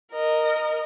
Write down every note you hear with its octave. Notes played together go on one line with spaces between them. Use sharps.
A#4 D#5